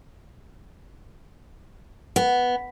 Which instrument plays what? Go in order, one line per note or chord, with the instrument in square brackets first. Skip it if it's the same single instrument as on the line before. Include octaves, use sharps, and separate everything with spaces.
[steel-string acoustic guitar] B3